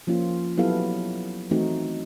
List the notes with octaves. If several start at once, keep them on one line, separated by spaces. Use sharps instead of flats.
F3 A#3 C#4 F4
F#3 B3 E4 G4 A4 F5
E3 A3 C4 D#4 F#4